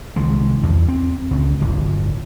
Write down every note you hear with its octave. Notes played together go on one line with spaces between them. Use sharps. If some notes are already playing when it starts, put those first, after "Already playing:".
C2 D#3 G#3
E2
C4
C#2
D1 G1